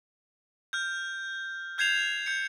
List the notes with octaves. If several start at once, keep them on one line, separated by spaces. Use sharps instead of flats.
F6 G6
F6 G6 G#6 C7 E7 F7
G6 C#7